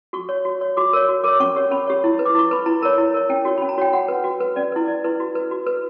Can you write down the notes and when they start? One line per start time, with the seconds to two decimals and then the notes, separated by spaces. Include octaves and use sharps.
0.13 F#4 C#6
0.29 C#5
0.45 F#4
0.61 C#5
0.77 F#4 D6
0.93 A#4 C#5
1.09 F#4
1.24 A#4 C#5 D6
1.40 C#4 C#6
1.56 G4 C#5
1.71 C#4 B5
1.87 G4 C#5
2.04 E4
2.19 B4
2.25 D6
2.35 E4 C#6
2.51 B4 B5
2.66 E4 A#5
2.82 A#4 C#5 A#5
2.98 E4
3.14 A#4 C#5
3.29 C#4 G5
3.45 F#4 C#5
3.58 C#4 B5
3.69 A#5
3.78 F#4 C#5 G5
3.93 F#4 F#5
4.08 B4
4.24 F#4
4.40 B4
4.56 C#4 D5
4.72 E4 B4
4.88 C#4 D5
5.04 E4 B4
5.20 F#4
5.35 B4
5.51 F#4
5.66 B4